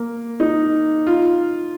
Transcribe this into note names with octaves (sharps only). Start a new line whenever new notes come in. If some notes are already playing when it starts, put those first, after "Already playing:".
Already playing: A#3
D#4
F4